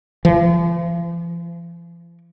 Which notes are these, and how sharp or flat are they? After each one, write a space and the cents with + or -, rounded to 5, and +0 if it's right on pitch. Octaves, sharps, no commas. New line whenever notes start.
F3 -45